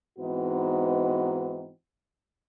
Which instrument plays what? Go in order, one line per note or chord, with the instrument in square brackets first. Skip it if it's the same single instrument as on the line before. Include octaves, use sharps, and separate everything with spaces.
[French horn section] G#2 E3 B3 C4 D#4 F#4